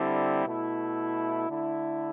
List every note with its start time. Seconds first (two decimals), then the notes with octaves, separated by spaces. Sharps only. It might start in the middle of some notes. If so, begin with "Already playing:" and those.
Already playing: D3 G3 C4 E4
0.46 B2 A3 E4
1.48 D3 A3 E4